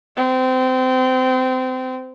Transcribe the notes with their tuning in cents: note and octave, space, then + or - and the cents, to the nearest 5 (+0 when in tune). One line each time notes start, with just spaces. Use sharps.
C4 -25